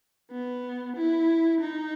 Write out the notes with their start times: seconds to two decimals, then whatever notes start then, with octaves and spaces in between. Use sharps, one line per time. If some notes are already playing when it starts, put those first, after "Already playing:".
0.31 B3
0.96 E4
1.60 D#4